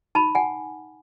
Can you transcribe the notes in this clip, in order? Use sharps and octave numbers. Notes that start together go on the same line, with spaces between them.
D#4 A5 B5
F#5 G#5